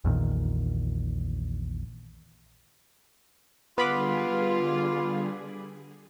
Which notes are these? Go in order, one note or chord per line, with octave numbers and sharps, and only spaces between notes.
A#1 E2 A#2 D#3
D3 G3 B3 F4 G#4 B4 B5 D6